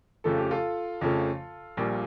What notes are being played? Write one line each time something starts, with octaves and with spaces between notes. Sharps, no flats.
F2 C#3 F3 A3 A4
G4
F4 A4
F2 C#3 F3 A3
A#1 A#2 G3 A#3